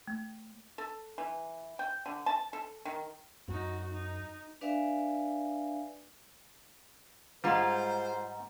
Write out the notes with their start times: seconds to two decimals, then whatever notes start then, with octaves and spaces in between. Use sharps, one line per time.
0.07 A3
0.78 A4
1.18 E3
1.79 G5
2.06 D3
2.26 A5
2.53 A4
2.85 D#3
3.48 F#2 D#4 F#4
3.93 D#4
4.61 D4 B4 D5 E5 F5 G#5
7.44 G#2 G3 G#3 F4 B4 C5 F#5 A#5